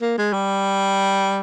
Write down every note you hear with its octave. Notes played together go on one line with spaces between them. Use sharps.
A#3
G#3
G3